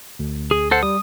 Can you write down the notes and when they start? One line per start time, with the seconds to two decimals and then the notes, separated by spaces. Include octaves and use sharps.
0.19 D2
0.51 G#4
0.71 A4 C5 F#5
0.83 G3 D#6